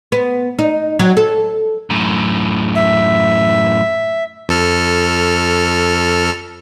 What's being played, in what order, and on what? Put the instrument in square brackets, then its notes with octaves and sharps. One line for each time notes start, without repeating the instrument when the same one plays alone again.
[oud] B3
D#4
F#3
A4
[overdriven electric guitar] F#2 A2
[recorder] E5
[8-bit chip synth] F2 A4 F6